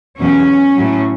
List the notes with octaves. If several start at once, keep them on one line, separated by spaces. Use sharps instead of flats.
E2 B2 F#3 C#4
A2 F#3